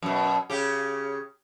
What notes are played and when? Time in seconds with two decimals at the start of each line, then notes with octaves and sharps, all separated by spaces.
0.02 F#2 B2
0.50 C#3 G4